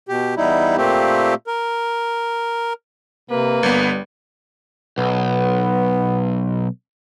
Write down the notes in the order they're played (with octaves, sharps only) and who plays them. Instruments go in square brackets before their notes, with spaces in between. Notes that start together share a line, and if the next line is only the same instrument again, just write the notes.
[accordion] B2 G4
E2 G3 D#4 E4
A#2 A3 A#3 C4 G4
A#4
[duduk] C3 [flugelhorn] A#3 [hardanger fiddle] B4
[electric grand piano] G1 B3 [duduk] G3
[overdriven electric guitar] B1 [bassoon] B3